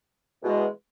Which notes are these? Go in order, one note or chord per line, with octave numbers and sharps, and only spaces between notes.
E2 B2 G#3